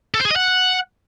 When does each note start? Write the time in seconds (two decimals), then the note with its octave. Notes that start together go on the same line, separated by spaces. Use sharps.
0.14 A4
0.20 C5
0.25 G#4
0.30 D#5
0.36 F#5